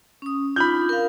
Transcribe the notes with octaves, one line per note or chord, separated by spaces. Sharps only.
C#4 D#6
D4 D#4 F4 B5 G6
A#4 F5